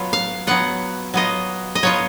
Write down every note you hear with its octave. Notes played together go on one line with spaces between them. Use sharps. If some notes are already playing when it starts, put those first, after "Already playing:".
Already playing: F#3 B3 F4
F5
F#3 B3 F4 F#5
F#3 B3 F4 D#5
D#5
F#3 B3 F4 C#5